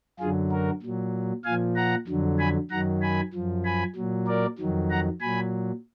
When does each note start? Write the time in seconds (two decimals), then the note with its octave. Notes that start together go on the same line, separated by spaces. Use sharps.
0.19 F#2 D3 F#3 F4 G#4
0.51 F#4 A#4
0.82 A#2 F#3
1.45 A#2 F3 F5 G#5
1.76 F#5 A#5
2.07 F2 D3 F#3
2.39 G#5 B5
2.70 F#2 D#3 F#3 F#5 A#5
3.02 G#5 B5
3.33 F#2 F3
3.65 G#5 B5
3.96 A#2 F#3
4.27 A#4 D5
4.58 F2 D#3 F#3
4.90 F#5 A#5
5.21 A#2 F#3 G#5 B5